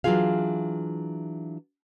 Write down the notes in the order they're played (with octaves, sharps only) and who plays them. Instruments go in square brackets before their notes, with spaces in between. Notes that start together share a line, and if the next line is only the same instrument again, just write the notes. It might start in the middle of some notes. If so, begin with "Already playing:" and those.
[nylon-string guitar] E3 F#3 D4 F4 G#4 F5